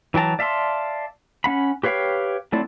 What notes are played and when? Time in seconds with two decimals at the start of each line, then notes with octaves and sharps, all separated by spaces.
0.14 E3 F#3 G5 A5 A#5
0.39 D5 E5 F5 A5 C6
1.44 C#4 F#5 B5
1.83 G4 B4 C#5 F5 G5
2.52 F#3 A3 C4 E4 D5